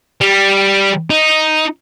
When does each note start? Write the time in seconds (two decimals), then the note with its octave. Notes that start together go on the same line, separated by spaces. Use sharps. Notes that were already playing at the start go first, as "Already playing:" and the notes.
0.21 G3
1.10 D#4